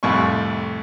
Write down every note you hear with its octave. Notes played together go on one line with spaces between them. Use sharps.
C2 F2 A2 B5 C#6